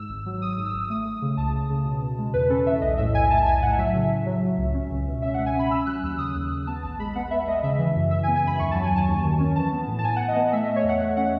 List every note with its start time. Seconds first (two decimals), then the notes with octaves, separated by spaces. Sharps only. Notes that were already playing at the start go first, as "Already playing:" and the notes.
Already playing: G#2 E6
0.09 G#1
0.26 F#3
0.41 F#3 D#6
0.53 G#2 D#6
0.65 E6
0.74 G#1
0.90 A3 D#6
1.05 A3
1.22 C#3
1.37 C#2 A5
1.54 C#3
1.70 C#3
1.85 B2
2.02 B2
2.18 G#3
2.34 E2 B4
2.50 C#4 A4
2.66 E2 E5
2.81 B1 D#5
2.97 A2 E5
3.15 B1 G#5
3.30 A2 A5
3.46 B1 G#5
3.62 A2 F#5
3.78 F#3 E5
3.95 C#3
4.10 C#3
4.26 F#3
4.43 F#3
4.58 C#2
4.74 C#4
4.90 C#2
5.07 B2
5.22 C#4 E5
5.34 C#2 F#5
5.46 G#5
5.55 C#4 B5
5.71 C#4 E6
5.87 F#3 F#6
6.03 D#2 E6
6.18 C#3 D#6
6.35 D#2
6.51 D#2
6.67 B3 A5
6.83 A1 A5
6.99 G#3 B5
7.15 B3 F#5
7.31 B3 E5
7.47 G#3 D#5
7.63 C#3 E5
7.79 E3
7.96 F#2
8.11 E3 E5
8.23 G#5
8.28 B3
8.36 G#5
8.44 F#2 B5
8.59 D#2 C#6
8.71 F#3 A5
8.83 G#5
8.92 D#2 A5
9.08 D#2
9.24 D#3
9.40 C#4
9.56 E3 A5
9.72 B3
9.87 A2
9.99 A5
10.03 A2 G#5
10.16 A2 F#5
10.28 D#5
10.36 B3
10.53 A3 E5
10.64 A3 D#5
10.76 C#5
10.84 E2
10.89 F#5
11.00 A3 F#5
11.17 C#4 F#5